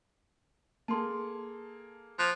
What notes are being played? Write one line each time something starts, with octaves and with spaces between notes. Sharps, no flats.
A#3 G#4 A4 A5 C6
F3 F#6